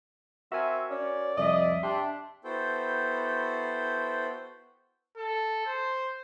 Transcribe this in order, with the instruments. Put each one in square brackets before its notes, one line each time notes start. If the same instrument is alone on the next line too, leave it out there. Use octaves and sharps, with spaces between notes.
[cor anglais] C4 [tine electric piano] F#4 A#4 G#5 [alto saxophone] E5
[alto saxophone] C#4 [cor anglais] D5
[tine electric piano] C2 F2 [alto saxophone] D#5 [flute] E5
[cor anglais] D4 [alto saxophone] G4 [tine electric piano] C6
[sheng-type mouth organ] B3 E4 F#4 A4 C5 G5
[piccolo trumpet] A4
C5